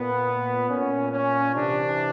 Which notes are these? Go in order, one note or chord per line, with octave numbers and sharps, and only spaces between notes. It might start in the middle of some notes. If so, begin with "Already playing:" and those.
Already playing: A#2 B3
A#2 C#4
C#4
C3 E3 D4